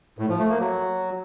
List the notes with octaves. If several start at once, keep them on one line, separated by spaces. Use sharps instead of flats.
A2
F3
A3
A#3
F#3